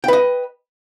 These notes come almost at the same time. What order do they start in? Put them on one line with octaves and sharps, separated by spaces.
G5 B4 D#5